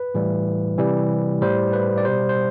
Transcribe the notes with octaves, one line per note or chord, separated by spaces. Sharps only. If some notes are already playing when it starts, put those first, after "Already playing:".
Already playing: B4
A2 E3 G3
C3 E3 G3
A2 G3 C5
B4
D5
B2 G3 C5
C5